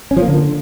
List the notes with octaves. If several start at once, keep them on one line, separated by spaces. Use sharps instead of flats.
C#4
F3
A#3
D3